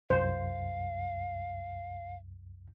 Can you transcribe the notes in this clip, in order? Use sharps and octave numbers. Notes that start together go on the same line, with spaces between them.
C2 F#2 C5 F5